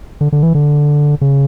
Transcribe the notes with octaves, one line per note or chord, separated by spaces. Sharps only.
D3
D3
E3
D3
C#3